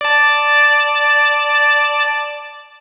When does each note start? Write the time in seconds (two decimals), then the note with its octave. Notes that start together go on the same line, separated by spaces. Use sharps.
0.01 D5 A5